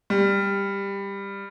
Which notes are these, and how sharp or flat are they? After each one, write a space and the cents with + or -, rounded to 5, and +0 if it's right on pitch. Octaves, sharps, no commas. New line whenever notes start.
G3 +15